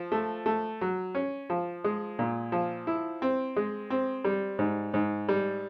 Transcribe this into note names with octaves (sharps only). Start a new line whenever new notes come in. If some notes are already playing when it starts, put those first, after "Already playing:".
Already playing: F3
A3
A3
F#3
C#4
F3
G#3
A#2
F3
E4
C4
G#3
C4
G3
G#2
G#2
G3